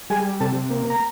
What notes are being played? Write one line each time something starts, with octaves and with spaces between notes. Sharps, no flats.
G3 G#4 G#5
C3 A4 A5
A#3
A#5